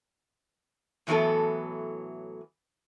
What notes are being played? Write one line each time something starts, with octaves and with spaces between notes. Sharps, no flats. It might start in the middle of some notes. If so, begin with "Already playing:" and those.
A2 E3 F#3 A#3 B3 A4